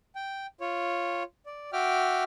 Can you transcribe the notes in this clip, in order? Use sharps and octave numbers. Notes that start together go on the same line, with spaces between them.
G5
F4 C#5
D5
F#4 E5 G5 D6 F6